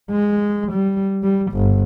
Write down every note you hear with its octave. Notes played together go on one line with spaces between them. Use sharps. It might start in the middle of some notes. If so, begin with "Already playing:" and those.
G#3
G3
G3
G1